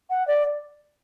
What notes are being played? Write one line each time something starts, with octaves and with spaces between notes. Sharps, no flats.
F#5
D5